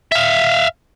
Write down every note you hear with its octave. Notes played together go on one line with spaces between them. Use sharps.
E5 F5